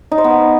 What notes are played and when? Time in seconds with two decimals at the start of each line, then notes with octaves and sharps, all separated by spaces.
0.12 D#4
0.18 C5
0.24 B3